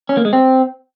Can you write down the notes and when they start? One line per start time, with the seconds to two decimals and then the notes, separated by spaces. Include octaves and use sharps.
0.09 C#4
0.17 A#3
0.25 G#3
0.33 C4